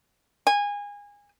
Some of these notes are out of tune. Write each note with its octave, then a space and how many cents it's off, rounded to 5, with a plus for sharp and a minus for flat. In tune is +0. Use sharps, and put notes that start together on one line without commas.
G#5 -25